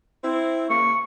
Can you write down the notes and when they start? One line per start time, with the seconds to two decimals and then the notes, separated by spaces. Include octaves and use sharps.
0.24 C4 E4
0.70 C#3 A#3 C#6